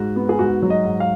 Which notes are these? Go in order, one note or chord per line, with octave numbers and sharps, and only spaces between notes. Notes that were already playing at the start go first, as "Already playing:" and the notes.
Already playing: G#2 F#4
B3
G#4
G#2 F#4
F#3
D#5
G#2
F5